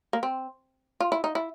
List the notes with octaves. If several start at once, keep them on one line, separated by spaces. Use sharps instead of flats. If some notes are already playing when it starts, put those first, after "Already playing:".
A#3
C4
F4
E4
D#4
E4